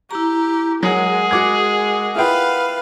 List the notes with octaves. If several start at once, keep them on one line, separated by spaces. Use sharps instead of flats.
E4 G4 A#5
F#3 G#3 G#4 A#4 F#5
F#4 D6 G#6
E4 F4 B4 F5 G5